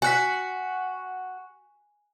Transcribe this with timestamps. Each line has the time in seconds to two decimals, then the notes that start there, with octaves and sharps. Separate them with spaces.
0.02 F#4 G#5 F#6 B6